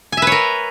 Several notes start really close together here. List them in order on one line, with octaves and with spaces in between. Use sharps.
G#5 E5 B4 C#5 A#4